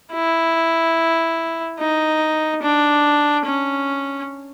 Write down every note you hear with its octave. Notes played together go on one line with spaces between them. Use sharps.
E4
D#4
D4
C#4